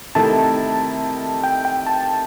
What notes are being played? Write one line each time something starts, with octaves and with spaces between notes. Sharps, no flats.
C3 D#3 A3 E4 A5
G5
G5
A5